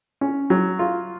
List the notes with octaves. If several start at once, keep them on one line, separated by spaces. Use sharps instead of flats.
C#4
F#3
F4